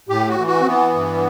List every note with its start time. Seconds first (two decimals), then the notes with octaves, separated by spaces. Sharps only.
0.09 A2 G4
0.28 F#4
0.38 E3
0.47 F#4
0.61 C4
0.66 E3 B3
0.94 G2